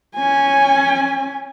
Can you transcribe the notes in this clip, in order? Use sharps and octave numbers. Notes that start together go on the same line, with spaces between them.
C#4 G#5